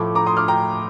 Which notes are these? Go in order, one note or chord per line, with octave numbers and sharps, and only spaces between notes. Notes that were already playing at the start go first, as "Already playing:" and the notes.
Already playing: A2 F3 A3 D6
A#5 D6
C6 D#6
D6 F6
G5 A#5